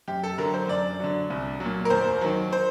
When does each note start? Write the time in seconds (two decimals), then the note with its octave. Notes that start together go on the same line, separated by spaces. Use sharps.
0.08 F#2 G4
0.23 A4
0.38 D3 F#3 A#4
0.54 C5
0.68 F#2 D5
1.00 D3 F#3
1.30 C2
1.60 F#3
1.65 A#2
1.85 A#4
1.90 D#2 C5
2.21 D#3 F#3
2.53 C5